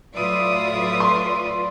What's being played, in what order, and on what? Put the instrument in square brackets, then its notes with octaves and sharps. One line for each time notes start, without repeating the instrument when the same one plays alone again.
[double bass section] A2 F#3 A3 [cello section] F4 B4 D5 [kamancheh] E5 D#6
[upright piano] C6